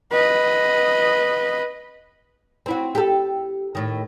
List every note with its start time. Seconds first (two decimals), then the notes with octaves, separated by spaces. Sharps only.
0.13 B4 D#5
2.66 C4 E4 F#4
2.95 G4 A4
3.75 A2 D#3